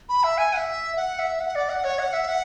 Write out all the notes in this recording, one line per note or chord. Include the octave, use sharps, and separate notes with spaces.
B5
E5
G#5
F#5
E5
F#5
E5
F#5
D5
F#5
C#5
F#5
E5
F#5